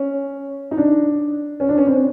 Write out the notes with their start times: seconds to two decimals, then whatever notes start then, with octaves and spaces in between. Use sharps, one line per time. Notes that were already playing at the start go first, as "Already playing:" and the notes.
Already playing: C#4
0.71 D#4
0.78 D4
1.60 C#4
1.69 D4
1.78 C#4
1.87 C4